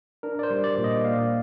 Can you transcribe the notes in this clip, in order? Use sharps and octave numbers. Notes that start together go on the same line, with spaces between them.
D4 A#4
D5
C5
G3
D5
A#2
D#5
A#2 F5